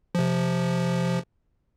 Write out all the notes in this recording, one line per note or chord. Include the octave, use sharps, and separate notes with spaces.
C3 F3